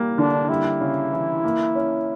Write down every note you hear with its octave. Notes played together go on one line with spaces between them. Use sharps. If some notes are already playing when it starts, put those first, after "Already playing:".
Already playing: G3 A#3
D3 D4
G3 E4
C#3
E3
A#3
C#4